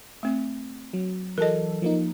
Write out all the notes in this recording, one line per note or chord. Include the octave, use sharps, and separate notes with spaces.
A3 C4
F#3
E3 F#3 A4 A#4 D#5
F3 A#3 D#4